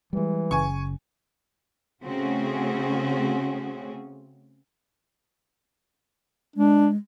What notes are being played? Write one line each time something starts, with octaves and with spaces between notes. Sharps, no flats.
E3 G3 G#3
F#1 C#3 G#5 C#6
C#3 A3 C4 C#4 F#4 G#4
G#3 D4